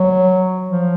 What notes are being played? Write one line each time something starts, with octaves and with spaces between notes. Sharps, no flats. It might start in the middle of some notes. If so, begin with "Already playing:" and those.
Already playing: F#3
F3